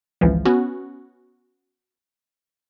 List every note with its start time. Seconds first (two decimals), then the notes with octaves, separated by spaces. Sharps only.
0.21 G#1 C#2 E3 F3
0.45 B3 C#4 F#4